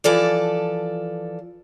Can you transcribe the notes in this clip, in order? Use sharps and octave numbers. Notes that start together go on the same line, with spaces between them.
E3 F3 A4 D5